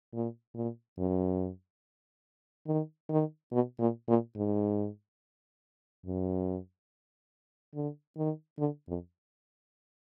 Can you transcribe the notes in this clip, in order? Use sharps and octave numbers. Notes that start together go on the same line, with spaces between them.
A#2
A#2
F#2
D#3
D#3
B2
A#2
A#2
G#2
F#2
D3
D#3
D3
F2